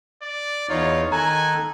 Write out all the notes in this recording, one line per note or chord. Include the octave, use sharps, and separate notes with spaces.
D5
E2 D#4 F4 C#5
D#3 A4 G#5 A#5 F#6